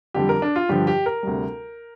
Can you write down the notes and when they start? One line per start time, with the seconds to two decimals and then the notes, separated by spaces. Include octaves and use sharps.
0.14 F2 D3 G3 G4
0.29 A#4
0.42 D4
0.56 F4
0.69 G2 D3 F3 G4
0.87 G4
1.06 A#4
1.23 D2 C3 G3